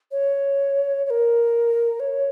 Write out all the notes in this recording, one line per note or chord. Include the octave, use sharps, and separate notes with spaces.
C#5
C#5
A#4
C#5